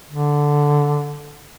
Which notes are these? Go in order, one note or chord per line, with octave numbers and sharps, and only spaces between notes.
D3